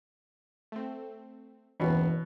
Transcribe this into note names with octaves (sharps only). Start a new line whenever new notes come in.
A3 C4
F#1 E2 G2 B2 E3